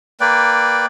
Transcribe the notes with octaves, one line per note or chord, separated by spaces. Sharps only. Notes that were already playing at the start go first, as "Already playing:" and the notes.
A#3 B4 D5 G5